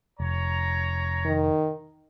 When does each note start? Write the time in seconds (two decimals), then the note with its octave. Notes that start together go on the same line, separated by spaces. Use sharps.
0.20 F1 C#5 A#5
1.25 D#3